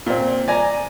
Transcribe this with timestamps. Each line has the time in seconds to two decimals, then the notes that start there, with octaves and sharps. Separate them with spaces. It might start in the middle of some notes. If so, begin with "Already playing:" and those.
0.06 A#2 C4
0.48 D5 G#5 A#5